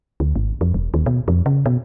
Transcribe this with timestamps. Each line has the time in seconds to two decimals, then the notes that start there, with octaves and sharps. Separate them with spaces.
0.20 D2
0.36 G#1
0.61 F2
0.74 E1
0.94 D#2
1.06 B2
1.28 F2
1.46 C#3
1.66 B2